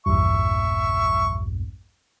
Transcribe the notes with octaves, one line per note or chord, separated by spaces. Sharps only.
A#1 E2 G2 E5 C#6